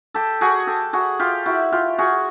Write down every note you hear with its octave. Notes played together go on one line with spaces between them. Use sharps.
G4 A4
F#4 G#4
G4 A4
F#4 G#4
F4 G4
E4 F#4
F4 G4
F#4 G#4